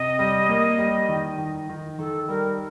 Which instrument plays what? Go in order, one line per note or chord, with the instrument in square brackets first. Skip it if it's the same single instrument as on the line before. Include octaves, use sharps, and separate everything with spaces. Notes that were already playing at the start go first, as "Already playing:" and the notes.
Already playing: [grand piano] C3 [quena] D#5
[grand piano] G3
A#3
G3
D#3
D#3
D#3
[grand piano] D#3 [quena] A4
[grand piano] G3 [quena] A#4